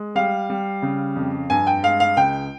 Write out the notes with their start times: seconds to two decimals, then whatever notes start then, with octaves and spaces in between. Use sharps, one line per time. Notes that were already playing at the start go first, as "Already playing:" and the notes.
Already playing: G#3
0.15 G3 F5
0.50 G3
0.82 C#3
1.16 F2
1.50 G2 G#5
1.67 G5
1.83 G#3 F5
2.00 F5
2.17 C#2 G5